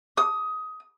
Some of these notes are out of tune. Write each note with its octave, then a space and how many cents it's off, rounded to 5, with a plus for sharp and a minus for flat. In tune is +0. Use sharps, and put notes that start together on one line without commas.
D#6 +20